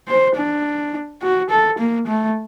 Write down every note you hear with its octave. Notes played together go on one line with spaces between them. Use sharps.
C5
D4
F#4
A4
A#3
A3